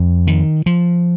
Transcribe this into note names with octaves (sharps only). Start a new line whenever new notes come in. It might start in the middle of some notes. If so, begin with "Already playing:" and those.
Already playing: F2
D#3
F3